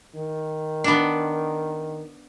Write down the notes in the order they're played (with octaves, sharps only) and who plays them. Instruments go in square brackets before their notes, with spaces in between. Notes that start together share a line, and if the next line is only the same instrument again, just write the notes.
[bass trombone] D#3
[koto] B3 D4